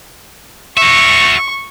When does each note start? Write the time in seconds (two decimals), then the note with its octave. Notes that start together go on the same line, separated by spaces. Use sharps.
0.77 F#4 E5 C#6